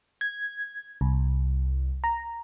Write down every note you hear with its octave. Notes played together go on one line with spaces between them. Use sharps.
G#6
C2
A#5